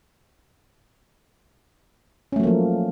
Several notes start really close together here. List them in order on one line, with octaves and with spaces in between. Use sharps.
C#4 A3 F#3 A#3 F3